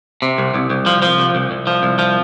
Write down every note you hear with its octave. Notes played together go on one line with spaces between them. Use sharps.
C3
C2
C2
C2
F3
F3
C2
C2
C2
F3
C2
F3